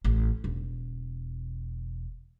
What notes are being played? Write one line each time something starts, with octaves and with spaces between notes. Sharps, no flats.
A1
E1